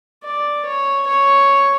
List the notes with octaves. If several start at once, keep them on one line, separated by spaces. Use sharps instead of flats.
D5
C#5
C#5